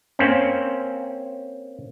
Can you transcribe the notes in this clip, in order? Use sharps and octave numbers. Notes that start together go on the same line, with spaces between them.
A#3 C4 C#4